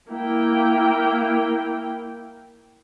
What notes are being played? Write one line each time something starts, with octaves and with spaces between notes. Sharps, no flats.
A#3 E4 G5